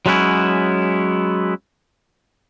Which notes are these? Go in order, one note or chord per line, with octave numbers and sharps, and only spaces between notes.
F#3 G#3 B3 C#4 E4